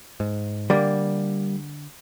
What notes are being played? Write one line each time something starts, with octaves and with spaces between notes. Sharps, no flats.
G#2
D3 G3 A#3